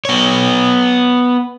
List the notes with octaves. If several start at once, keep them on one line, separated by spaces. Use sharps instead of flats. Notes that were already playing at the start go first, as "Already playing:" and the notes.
B3 C#5